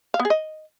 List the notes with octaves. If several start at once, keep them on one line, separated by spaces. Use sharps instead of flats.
F5
B3
G#4
D#5